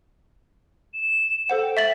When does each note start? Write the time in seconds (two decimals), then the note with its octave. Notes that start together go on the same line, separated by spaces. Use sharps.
0.94 E7
1.50 A4 C5 F#5
1.61 G5
1.77 E5 A6 F#7